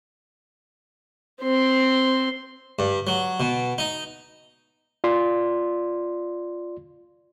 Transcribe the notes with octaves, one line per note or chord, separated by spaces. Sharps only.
C4 C6
G2
F#3
B2
D#4
F4 D5 C6